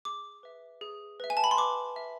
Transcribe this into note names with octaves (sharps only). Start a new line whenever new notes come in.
G#4 D6
B4 E5
G#4
B4 E5
G#5
A5
B5
C6
B4 D6
E5